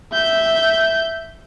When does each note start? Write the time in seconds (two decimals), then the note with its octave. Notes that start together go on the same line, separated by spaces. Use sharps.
0.12 E5 G6